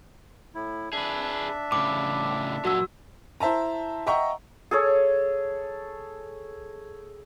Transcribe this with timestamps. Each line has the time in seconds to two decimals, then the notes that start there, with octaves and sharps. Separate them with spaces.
0.55 A2 E4
0.93 D4 G#4 B4 E5
1.72 A2 C#3 D6
2.65 A#2 F#3 F#4 E6
3.40 E4 C5 E5 A5 A#5
4.06 D#5 E5 F#5 G5 A#5 C#6
4.71 G#4 A4 C#5